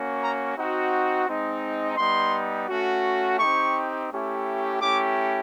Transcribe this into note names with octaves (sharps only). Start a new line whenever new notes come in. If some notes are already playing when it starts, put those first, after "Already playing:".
Already playing: A#3 C#4 F#4
A#5
C4 D#4 F#4
G#3 C4 D#4
G3 B3 D#4 C6
A3 C#4 F#4
C4 D#4 G4 C#6
A3 C#4 E4 G4
A3 C#4 E4 G4 D6